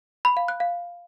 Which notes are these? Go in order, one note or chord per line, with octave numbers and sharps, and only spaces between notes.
B5
F5
F#6
F5